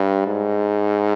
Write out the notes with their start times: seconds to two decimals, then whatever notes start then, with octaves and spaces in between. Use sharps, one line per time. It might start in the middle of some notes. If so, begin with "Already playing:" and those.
Already playing: G2
0.27 G#2